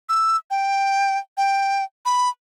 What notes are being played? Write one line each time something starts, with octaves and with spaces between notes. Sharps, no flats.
E6
G5
G5
B5